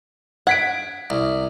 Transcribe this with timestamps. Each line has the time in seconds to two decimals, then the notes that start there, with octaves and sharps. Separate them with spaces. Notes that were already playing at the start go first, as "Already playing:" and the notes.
0.47 F#5 G#6 B6 D7
1.10 C2